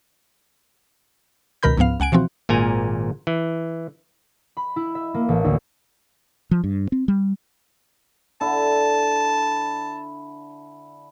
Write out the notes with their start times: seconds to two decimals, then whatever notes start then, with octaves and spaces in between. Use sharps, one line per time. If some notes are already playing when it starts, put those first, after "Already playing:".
1.63 C#2 B2 D#3 A#4 B5 G6
1.77 C#2 G#2 F3 B3 F5
2.00 C#2 F#5 G#5 D7
2.12 B2 E3 F3 C4 F#4
2.49 G#1 A#2 G#5 A#5
3.27 E3
4.57 B5
4.76 E4
4.95 E5
5.14 A#3
5.29 A1
5.44 D2
6.51 F3
6.64 G2
6.92 C4
7.08 G3
8.41 D3 E4 A5